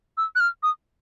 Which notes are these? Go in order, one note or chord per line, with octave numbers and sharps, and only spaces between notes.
E6
F#6
F6
D#6